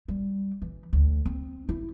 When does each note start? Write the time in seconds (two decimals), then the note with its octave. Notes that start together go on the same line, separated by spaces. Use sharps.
0.08 G3
0.62 E3
0.93 D2
1.26 C4
1.69 E4